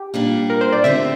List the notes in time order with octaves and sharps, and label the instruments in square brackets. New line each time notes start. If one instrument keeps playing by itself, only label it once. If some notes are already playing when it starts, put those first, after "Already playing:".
Already playing: [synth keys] G4
[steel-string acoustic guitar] A#2 G3 D4
[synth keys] A#4
C5
D5
[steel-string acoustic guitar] D3 A3 C4 G4 [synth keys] E5